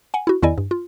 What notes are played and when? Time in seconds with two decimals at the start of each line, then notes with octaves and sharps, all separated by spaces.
0.14 F#5 G#5
0.27 E4 F#4
0.43 E2 D#3 E4 D5 D#5 G#5
0.58 G2
0.71 F4